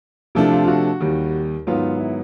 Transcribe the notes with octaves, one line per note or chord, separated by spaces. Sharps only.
C3 F3 A3 D4 E4
F4
F4
F#4
D#2 D#3 G3
G#2 D#3 F#3 B3 F4
E4